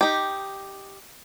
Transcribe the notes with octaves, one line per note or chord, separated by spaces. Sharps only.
D#4 G4